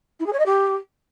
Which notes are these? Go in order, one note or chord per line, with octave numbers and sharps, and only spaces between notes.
E4
G#4
C#5
D#5
G4